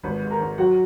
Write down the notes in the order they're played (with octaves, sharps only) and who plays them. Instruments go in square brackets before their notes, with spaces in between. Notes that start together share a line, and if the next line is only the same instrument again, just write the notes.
[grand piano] G#1 B4 B5
G#2
A#4 A#5
G#1
F#3 F#4 F#5